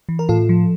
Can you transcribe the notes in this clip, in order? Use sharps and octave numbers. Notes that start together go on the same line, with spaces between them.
E3
A#4
A2 F4 A4
F3